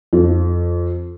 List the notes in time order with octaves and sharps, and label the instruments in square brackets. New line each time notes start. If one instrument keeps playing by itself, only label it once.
[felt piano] F2